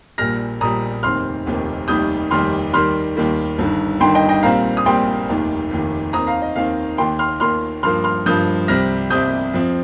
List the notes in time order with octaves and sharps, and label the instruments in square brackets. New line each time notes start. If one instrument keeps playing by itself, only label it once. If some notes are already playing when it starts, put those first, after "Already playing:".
[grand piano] A#1 A#2 G3 F6 A#6
A#1 A#2 G3 A#5 D#6
F1 D#2 D#3 C4 C6 F6
F1 D#2 D#3 C4
F1 D#2 D#3 G3 D#6 G6
F1 D#2 D#3 G3 C6 F6
D#2 D#3 G3 A#3 C6 F6
D#2 D#3 G3 A#3
G1 G2 D#3
G1 G2 D#3 G5 C6
D#5 G5
D#5 G5
A#1 A#2 G3 C4 F5 A#5
D#6
A#1 A#2 G3 C4 G5 C6
F1 D#2 D#3
F1 D#2 D#3
D#2 D#3 C4 A#5 D#6
F5 A#5
D#5
D#2 D#3 C4 F5
D#2 D#3 A#3 G5 C6
C6 F6
D#2 D#3 A#3 C6 F6
G2 F3 A#3 C6 F6
C6 F6
G2 F3 A#3 D#6 G6
C2 C3 G3 C4 F6 A#6
C2 C3 G3 C4 D#6 G6
F2 F3 C4